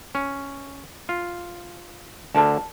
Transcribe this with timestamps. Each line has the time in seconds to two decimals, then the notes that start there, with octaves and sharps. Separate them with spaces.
0.15 C#4
1.09 F4
2.35 D2 D3 A#4 A5